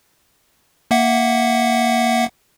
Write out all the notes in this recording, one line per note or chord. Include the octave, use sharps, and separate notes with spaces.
A#3 E5 F#5